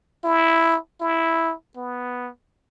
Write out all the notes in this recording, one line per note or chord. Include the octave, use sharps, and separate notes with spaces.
E4
E4
B3